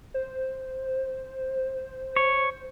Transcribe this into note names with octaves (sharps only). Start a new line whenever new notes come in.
C5
C#5